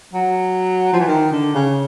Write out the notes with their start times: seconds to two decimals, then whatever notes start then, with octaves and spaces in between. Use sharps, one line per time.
0.13 F#3
0.93 F3
1.00 E3
1.07 D#3
1.32 D3
1.55 C#3